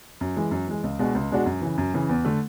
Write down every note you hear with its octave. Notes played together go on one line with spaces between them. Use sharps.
F#2
E3 G#3
F#2
E3 G#3
C#2
B2 G#3 D4 F#4
C#2
B2 G#3 D4 F#4
F#2
C#3 E3
F#2
C#3 E3
E2
D3 A3